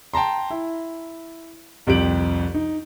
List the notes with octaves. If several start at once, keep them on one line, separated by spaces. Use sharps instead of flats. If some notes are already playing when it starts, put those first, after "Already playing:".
G5 A5 A#5 C6
E4
C2 F2 G4 D7 F#7
D#4